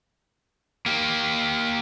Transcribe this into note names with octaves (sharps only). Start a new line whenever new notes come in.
A#3 G4